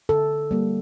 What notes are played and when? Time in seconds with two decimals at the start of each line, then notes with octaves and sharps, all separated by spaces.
0.09 D3 A4
0.51 G3 A#3